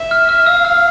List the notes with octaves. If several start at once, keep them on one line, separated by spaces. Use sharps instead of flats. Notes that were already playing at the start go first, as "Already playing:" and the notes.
Already playing: E5
F6
F6
F5 E6
F6